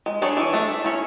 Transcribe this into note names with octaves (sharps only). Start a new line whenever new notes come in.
G#3
D4 G#4 C#5
E3
A3 D4
A3
C#4 E4